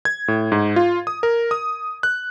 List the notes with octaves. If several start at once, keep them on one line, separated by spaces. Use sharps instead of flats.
G#6
A2
G#2
F4
D#6
A#4
D#6
F#6